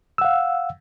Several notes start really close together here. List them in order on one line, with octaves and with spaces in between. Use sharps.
E6 F#5 F5